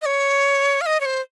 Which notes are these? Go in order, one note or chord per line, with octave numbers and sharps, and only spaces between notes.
D#5
C#5
F5
D#5
C#5
C5